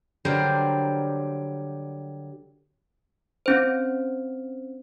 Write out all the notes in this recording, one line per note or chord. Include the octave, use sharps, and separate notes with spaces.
D3 F#3 G3 A#4 C5
C4 C#4 C5